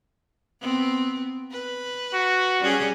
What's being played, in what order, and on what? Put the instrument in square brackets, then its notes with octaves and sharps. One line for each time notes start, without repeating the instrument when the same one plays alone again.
[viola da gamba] B3 C4
B4
[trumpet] F#4
[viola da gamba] G3 C#4 G#4